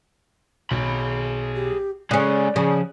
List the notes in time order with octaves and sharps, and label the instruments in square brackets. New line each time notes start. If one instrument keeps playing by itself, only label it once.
[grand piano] B1 [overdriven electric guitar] G#4 B5
[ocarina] G4
[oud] C#3 C#4 [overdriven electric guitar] G#3 A4 [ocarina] D5 [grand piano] F#6
[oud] C#3 [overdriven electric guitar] F3